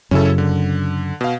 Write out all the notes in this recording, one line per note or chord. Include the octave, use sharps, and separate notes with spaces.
F#2 C#3 C#4 E4 A4
D3
B2 F5